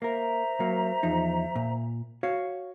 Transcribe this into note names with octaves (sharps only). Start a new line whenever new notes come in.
A#3 A#4 C5 E5 A#5
F#3 A#3
E2 F3 D#4
A#2
F#4 C#5 F5